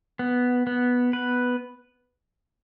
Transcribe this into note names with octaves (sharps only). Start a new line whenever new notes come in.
B3
B3
B4